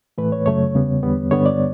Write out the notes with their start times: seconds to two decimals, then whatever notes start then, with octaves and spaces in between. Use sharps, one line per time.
0.18 A2 E3 A3 B4
0.32 C#5
0.46 F#2 C#3 F#3 A3 C#5
0.75 E2 C#3 G3 B3
1.03 E2 D3 G3 B3
1.31 G2 D3 G3 B3 C#5
1.46 D5